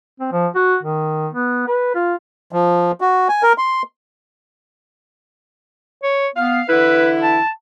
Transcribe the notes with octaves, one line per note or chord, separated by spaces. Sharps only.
C4
F3
F#4
D#3
B3
B4
F4
F3
F#4
G#5
A#4
C6
C#5
B3 F5
D3 E3 E4 B4
A5